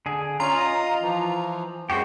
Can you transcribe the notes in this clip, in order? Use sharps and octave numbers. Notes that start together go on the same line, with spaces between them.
D3 G#4
C#4 F4 A#5
D#5 D#6
E3 F3
F#2 G#3 C4 F#4 G4 G5